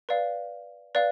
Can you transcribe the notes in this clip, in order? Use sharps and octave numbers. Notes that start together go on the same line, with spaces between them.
B4 D5 F5
B4 D5 F5